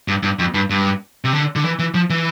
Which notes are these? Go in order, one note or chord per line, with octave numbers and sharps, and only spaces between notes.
G2
G2
F2
G2
G2
C3
D3
D3
E3
E3
F3
E3